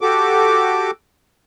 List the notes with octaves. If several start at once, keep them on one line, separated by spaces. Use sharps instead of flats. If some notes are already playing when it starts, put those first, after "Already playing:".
F#4 G4 A4 D6